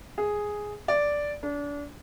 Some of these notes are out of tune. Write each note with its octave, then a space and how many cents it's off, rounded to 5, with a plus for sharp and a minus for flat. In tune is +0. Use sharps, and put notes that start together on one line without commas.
G#4 +0
D5 -5
D4 -30